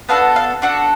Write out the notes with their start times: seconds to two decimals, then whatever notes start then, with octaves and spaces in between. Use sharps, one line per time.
0.09 B3 D4 F#4 A4 F5
0.36 F5
0.62 D4 F#4 A4 F#5